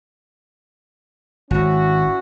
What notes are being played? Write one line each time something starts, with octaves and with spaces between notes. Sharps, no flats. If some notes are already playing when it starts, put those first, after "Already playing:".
G#1 C#4 E4 F#4